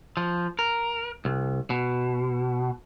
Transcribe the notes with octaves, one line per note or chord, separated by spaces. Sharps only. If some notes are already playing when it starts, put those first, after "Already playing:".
F3
A#4
C2
B2